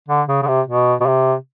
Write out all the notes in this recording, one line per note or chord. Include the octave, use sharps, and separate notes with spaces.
D3
C#3
C#3
C3
B2
B2
C3